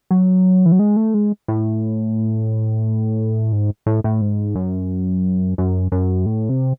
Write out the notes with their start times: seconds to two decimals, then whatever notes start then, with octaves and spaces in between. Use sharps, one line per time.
0.11 F#3
0.66 E3
0.72 F#3
0.79 G#3
0.96 A3
1.14 G#3
1.48 A2
3.52 G#2
3.86 A2
4.04 A2
4.21 G#2
4.55 F#2
5.58 F#2
5.92 F#2
6.26 A2
6.49 C3